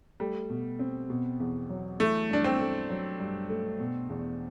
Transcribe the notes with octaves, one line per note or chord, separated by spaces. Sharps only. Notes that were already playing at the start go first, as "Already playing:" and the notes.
G3 A3
B2
C4
B2
E2
F#3
E3 A3
G2 D4
C4
A3
F#3
G2
A3
B2
E2